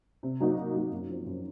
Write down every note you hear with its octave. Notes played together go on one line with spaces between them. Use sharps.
C3
F#3 A#3 D#4 F#4
C3
F#3 A#3 D#4 F#4
F#2
F3 C4
F#2